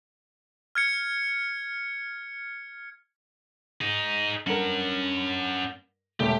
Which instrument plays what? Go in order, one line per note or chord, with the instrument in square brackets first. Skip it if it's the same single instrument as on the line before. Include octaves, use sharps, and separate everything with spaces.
[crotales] F6 G#6 C#7
[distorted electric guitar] D#4 G#4
[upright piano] G2 A#4 [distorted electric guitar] C#4 F#5
[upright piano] E1 A3 [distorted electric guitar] G4